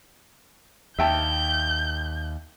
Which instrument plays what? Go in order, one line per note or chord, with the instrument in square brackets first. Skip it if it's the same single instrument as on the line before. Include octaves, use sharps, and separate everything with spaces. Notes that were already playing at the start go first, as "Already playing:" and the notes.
[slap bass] D#2 [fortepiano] E5 G5 A5 [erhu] G6